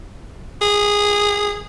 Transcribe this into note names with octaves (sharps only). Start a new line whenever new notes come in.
G#4